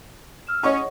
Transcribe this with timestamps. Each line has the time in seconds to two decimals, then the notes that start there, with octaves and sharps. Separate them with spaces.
0.47 E6 F6 E7
0.63 C#4 G#4 C#5 D#5 F#5 C#6